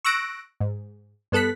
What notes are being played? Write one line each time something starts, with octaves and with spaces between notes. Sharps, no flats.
C#6 E6 F#6 A#6 D7
G#2
G2 B3 A4 F#6 B6